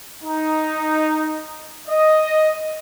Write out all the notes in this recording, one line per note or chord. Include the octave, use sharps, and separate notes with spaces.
D#4
D#5